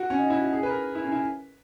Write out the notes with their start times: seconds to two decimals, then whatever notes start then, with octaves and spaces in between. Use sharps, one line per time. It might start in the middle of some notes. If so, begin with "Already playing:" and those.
Already playing: F#4
0.10 C#4
0.19 D#4
0.30 E4
0.41 F#4
0.52 G#4
0.63 B4
0.70 A#4
0.95 E4
1.04 C#4
1.12 E4